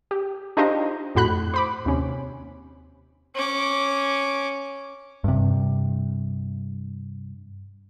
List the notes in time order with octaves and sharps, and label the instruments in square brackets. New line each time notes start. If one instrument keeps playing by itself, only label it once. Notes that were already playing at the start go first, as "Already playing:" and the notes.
[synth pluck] G4
D4 D#4 F4 G4 C5 D#5
F2 A2 F#4 B5 F#6
C5 B5 D6
D#2 C3 C#4
[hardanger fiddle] C#4 D6
[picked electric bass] G2 C3